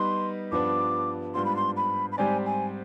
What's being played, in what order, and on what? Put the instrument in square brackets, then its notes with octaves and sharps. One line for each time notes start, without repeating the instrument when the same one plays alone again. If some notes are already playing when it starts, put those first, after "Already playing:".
Already playing: [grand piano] G3 B3 D#4 B4 [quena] C6
[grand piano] G2 F3 B3 D4 [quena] D6
[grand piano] G#2 G3 B3 D4 F4 [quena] C6
[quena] B5
C6
B5
B5
[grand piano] G#2 G3 C4 G4 D5 [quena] G#5
[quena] G#5